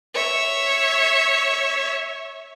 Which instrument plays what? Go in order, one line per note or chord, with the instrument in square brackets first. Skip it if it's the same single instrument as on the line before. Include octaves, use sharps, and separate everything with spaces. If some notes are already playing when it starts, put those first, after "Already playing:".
[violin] C#5 E5